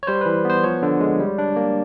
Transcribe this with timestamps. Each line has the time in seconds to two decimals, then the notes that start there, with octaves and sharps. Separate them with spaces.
0.03 C#5
0.07 G3 C5
0.21 E3 B4
0.45 B3 C5
0.64 F3 C#5
0.83 D3
1.01 G#3
1.19 G3
1.38 D4
1.56 A#3